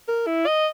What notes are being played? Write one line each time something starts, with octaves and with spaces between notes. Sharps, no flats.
A#4
E4
D#5